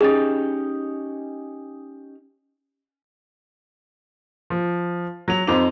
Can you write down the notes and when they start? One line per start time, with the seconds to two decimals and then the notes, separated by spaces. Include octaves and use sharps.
0.01 C#4 D#4 G4 G#4 A6
4.50 F3
5.28 F#3 F7
5.47 F2 D#4 C5 D6 F7